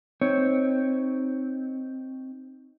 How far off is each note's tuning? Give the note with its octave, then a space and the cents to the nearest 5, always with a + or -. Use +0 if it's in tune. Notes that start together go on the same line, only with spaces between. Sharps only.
C4 +0 D#4 +0 C#5 +0